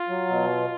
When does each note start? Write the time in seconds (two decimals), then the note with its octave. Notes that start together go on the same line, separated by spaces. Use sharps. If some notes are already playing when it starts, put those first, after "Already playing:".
Already playing: F4
0.08 F#3
0.29 B2